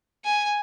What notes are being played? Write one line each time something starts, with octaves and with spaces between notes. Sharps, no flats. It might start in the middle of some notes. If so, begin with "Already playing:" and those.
G#5